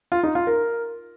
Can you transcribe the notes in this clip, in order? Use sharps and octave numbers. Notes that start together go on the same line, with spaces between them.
F4
D#4
F4
A#4